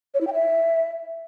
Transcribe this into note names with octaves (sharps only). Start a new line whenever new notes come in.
C#5
E4
G5
E5